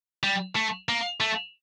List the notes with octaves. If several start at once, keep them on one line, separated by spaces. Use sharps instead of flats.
G3
A3
A#3
A3